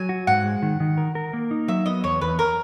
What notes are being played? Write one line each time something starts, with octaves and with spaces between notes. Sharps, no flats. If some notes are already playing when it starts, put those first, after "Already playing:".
Already playing: F#3 G#5
F#4
G#2 F#5
G#3
D#3
D#3
A#4
A#4
A#3
D#4
F#3 E5
B3 D#5
E2 C#5
E2 B4
A#4